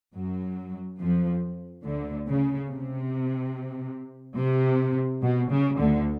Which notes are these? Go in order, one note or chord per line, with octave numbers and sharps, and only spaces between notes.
F#2 F#3
F2 F3
D2 D3
C#3
C3
C3
B2
C#3
D2 D3